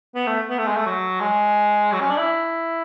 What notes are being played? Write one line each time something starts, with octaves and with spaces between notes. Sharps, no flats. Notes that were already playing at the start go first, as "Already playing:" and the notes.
B3
A3
B3
A3
G#3
A3
F#3
G#3
F#3
C#4
D4
E4